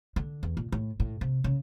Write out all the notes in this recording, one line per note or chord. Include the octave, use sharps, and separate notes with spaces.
D3
E2
A#2
A2
A2
C3
C#3